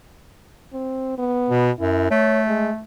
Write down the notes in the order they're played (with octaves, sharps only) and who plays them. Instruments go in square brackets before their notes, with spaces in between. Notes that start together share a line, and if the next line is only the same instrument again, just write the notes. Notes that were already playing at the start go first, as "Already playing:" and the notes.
[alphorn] C4
B3
[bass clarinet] B2
[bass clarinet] F#2 [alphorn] E4
[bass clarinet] A3 [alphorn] C#5
[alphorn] G#3